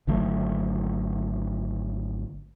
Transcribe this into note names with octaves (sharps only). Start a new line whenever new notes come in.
G#1 D3 F#3 A3